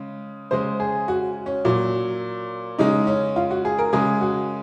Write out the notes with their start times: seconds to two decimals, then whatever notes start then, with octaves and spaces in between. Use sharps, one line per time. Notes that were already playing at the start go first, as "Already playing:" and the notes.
Already playing: C#3 G#3
0.51 C#3 G#3 C5
0.80 G#4
1.08 F#4
1.46 C#4
1.65 A#2 F#3
2.79 C#3 G#3 D#4
3.07 C#4
3.36 F4
3.51 F#4
3.65 G#4
3.78 A#4
3.93 C#3 G#3 G#4
4.21 F#4